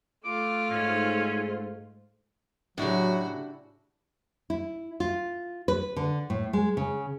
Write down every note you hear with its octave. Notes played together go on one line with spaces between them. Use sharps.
A3 F4 D6
G#2 C#4
A2 C#3 F#3 D4 E4 F#4 G4
E4
F4
B4
D3
A2
G#3
C#3